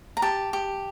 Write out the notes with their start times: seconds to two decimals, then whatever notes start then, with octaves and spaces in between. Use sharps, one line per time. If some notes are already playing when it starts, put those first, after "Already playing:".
0.17 A#5
0.22 G4 A5
0.53 G4